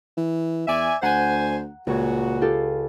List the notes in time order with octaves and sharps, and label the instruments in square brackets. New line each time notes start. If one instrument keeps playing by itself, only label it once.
[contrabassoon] E3
[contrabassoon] E2 [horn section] D5 E5 G#5
[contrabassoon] D2 [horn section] C5 G#5 [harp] F#5 A#5
[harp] C#2 C#5 [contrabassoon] A#2 [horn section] F#4
[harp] F4 G4 A4